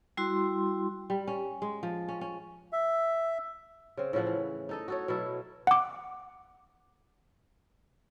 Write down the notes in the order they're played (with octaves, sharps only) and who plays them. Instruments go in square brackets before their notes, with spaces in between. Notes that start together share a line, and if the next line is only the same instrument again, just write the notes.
[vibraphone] G3 E4 F#4 C6
[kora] G3
C#4
G#3
F3
C#4
C#4
[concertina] E5
[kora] C#3 C4
A2 C#3 F3 F#5
E3
D#4 A4 D#5
F#4 A4 C#5
B2 F#3 E4 A4
[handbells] F#5 D6